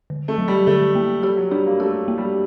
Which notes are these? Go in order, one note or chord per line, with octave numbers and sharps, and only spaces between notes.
D3
A3
F#3
G3
D3 A3
A#3
G3 G4
F#3
G3 D4
A#3
A3 G4
A#3
G3